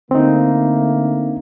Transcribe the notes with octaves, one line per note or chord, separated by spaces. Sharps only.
D3 A3 A#3 C4 D#4